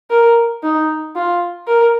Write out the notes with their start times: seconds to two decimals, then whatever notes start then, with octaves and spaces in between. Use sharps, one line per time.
0.11 A#4
0.63 D#4
1.15 F4
1.68 A#4